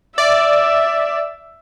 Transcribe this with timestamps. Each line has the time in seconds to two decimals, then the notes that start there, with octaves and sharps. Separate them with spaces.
0.18 D5 E5